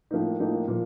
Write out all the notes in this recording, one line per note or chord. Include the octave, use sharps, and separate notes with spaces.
A2 F3 A#3 D#4
A2 F3 A#3 D#4
A#2 F3